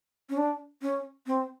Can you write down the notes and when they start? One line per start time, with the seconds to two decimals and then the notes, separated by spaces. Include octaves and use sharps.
0.30 C#4
0.37 D4
0.82 C#4
1.27 C4